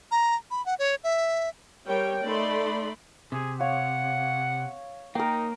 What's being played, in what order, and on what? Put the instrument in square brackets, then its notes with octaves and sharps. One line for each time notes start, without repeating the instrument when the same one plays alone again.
[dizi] A#5
B5
F#5
C#5
E5
[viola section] G3 A#4 C#5 G5
A3 D#4 D5 B5 C6
[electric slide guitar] C3 [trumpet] G#4
[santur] C#5 F5 [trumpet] F#5
[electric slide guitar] A#3 [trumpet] D#4 [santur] A#4 G5